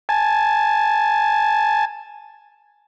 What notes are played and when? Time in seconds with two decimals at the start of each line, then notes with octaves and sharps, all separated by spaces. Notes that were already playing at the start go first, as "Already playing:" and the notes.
0.09 G#5 A5